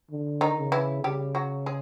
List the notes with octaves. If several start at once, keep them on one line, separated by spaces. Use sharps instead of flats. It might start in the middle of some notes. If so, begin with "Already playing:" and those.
D3
D#3 D#4
C#3
E3 E4
C#3 G3 G4
F#3 F#4
G#3 G#4